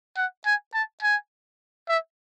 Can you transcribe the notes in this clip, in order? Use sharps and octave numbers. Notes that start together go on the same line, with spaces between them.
F#5
G#5
A5
G#5
E5